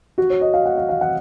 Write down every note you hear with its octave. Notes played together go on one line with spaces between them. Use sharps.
F#4
C#5
D#5
F5
F#5
F5
F5
F#5